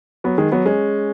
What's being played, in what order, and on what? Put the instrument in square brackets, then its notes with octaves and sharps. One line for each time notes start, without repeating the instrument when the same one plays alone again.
[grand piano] F#3 B3
D#3 G#3
F#3 B3
G#3 C#4